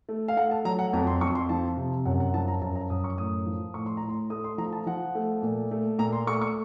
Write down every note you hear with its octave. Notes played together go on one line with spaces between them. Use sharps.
A3
F5
A3 F#5
A5
F#3 A#5
F#5
F2 A#5
C6
F2 C#6
C6
F3 A5
C3
F#2 F#5
F#5
F3 A5
A#5
F#2 A5
A#5
F#2 D#6
C#6
A2 D#6
F3
A2 C#6
C6
A2 A#5
C6
A3 D#6
C6
F3 A#5
A5
F3 F#5
A3
A#2
A3
A#2 A#5
C6
A3 C#6
C#6